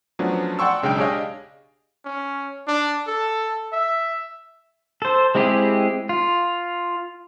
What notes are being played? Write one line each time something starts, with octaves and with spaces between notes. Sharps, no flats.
F3 F#3 A3 B3 C#4 D4
D5 F#5 G5 C6 C#6 E6
B1 C#3 G#3 D4 G5 D7
D4 G4 G#4 C#5 D#5 F5
C#4
D4
A4
E5
A4 C5
G#3 C4 E4 G4 G#4
F4